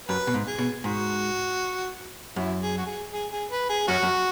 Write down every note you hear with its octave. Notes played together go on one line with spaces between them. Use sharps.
F#2 B4
B2
G#2
G#4
B2
G#2 F#4
F#2 E4
G#4
F#4
G#4
G#4
G#4
B4
G#4
F#2 C#4 F#4
F#2